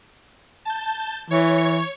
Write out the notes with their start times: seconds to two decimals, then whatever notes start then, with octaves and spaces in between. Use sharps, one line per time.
0.65 A5 G6
1.31 E3 C#5 C#6